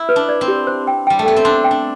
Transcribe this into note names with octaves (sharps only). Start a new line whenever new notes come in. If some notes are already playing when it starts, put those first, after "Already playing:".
Already playing: E4
B4
D4
D5
C4
G4
C5
G5
G3 G5
A3
B3 G5
C4
D4 C6
G5
D4